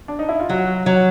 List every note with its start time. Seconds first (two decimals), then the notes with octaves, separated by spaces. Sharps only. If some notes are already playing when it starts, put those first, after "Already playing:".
0.08 D4
0.19 D#4
0.29 E4
0.40 F4
0.49 F#3 F#4
0.86 F#3